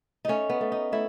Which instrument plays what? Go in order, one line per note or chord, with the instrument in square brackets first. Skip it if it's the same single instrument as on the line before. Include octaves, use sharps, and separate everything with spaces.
[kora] A3 C#4 D#4
B3
A3
D#4
A3 E4